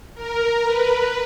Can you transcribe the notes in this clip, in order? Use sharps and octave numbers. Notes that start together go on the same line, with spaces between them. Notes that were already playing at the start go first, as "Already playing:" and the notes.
A#4
B4